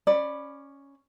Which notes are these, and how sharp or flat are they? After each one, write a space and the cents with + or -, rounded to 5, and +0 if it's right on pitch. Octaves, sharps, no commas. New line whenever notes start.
C#4 +0 D5 +20 B5 +0